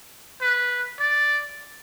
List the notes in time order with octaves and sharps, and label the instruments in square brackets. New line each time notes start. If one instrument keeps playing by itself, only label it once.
[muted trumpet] B4
D5